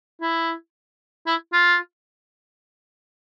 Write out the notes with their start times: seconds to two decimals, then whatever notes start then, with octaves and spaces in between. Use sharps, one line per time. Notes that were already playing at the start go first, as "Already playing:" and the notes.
0.21 E4
1.27 E4
1.53 F4